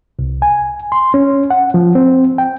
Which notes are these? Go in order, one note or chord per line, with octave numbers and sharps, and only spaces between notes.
C2
G#5
C6
C#4
F#5
F3
C4
G5